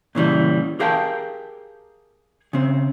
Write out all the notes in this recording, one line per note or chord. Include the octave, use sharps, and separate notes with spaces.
A#2 C#3 E3 G3
G4 G#4 A#4 F5 G5 A5
C#3 C4